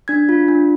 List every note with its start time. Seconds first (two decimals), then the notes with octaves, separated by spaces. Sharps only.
0.08 D4 G#6
0.29 F4
0.48 D4